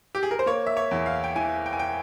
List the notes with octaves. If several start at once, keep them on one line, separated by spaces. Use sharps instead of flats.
G4
G#4
A#4
C5
A#3 C#5
E5
C#5
E2
F5
G5
E3 G#5
G5
G#5
G5